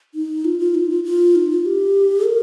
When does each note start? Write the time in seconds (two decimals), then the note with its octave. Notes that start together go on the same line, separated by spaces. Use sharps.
0.15 D#4
0.45 F4
0.59 F4
0.75 D#4
0.90 F4
1.04 F4
1.36 D#4
1.49 F4
1.66 G4
2.25 A#4